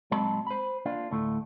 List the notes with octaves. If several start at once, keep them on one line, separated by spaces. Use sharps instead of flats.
A#2 F#3 G#3 C4 A5 B5
C5 B5
A#3 D4 F4
D2 A2 A3